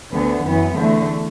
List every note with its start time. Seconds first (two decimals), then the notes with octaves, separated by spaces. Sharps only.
0.11 D2 D3 B3
0.43 F#2 E3 B3
0.75 E2 D3 A3